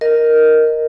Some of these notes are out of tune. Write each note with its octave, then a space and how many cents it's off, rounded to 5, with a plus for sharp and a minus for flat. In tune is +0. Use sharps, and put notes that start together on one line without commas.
A#4 +0 D#5 +0